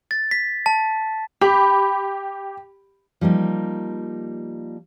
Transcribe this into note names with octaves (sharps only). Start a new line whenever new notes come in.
A6
B6
A5
G4 B5
F3 G3 A#3 D#4